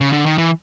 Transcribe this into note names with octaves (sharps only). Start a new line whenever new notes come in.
C#3
D3
D#3
E3